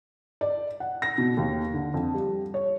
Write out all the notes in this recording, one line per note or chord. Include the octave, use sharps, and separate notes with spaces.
D5
F#5
A#6
B2
D#2
D3
F2
G3
C#5